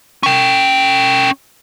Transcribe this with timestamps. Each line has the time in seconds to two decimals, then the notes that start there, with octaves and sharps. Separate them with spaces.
0.23 C#4 G5